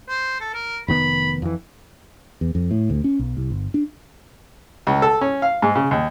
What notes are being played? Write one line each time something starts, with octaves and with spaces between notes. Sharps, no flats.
C5
A4
A#4
F1 D#3 B3 B5
F2 E3
E2
F2
A2
D2
C#4
B1
C2
G1
D4
C#2
A4
C#4
F5
G#2
C#3
D#2